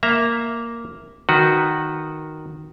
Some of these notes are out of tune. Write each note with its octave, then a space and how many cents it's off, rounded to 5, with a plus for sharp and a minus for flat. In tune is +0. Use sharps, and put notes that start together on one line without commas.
A#3 +0 E5 +0 A#5 +0
D#3 -5 F#4 +0 B4 +0